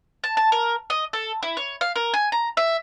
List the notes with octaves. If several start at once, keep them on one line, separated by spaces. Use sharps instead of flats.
A5
A5
A#4
D#5
A4
E4
C#5
F5
A#4
G#5
A#5
E5